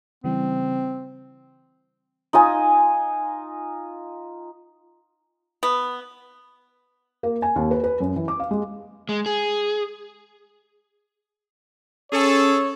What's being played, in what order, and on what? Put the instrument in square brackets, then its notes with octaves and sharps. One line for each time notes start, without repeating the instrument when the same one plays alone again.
[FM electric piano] C#3 E3 G3 [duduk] C4
[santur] D#4 F4 D#5 G#5
[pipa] B3
[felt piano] A#3
G#5
D#2
B4
B4
F#2
E3
D6
F5
G#3
[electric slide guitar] G#3
G#4
[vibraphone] C#4 [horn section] G#4 A4 [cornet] C#5